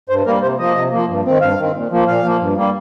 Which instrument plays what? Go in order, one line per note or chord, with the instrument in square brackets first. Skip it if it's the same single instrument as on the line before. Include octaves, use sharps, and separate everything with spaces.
[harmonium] G2 C5
G3 A#3 A#4
C3 C5
F3 A#3 D#5
C3
F3 A#3
G2
D#3 C4
G2 F5
D#3 C4
A#2
F3 A#3
A#2 F5
F3 A#3
G2
G3 A#3